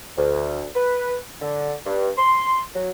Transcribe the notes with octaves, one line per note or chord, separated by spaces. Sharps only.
D2
B4
D3
G2
C6
F#3